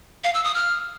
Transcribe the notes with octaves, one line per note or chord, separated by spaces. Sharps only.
F5
E6
D#6
F6